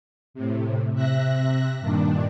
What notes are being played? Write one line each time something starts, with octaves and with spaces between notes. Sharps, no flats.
A2 C3
C3 E5 F#6 A#6
G2 A#2 D#3 D4